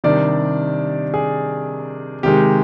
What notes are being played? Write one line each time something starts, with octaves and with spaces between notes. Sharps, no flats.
C3 D#3 G3 D4 D5
G#4
C3 D#3 G#3 G4